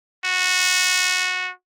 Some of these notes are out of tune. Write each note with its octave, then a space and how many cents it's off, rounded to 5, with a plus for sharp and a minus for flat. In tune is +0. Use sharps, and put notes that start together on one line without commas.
F#4 -15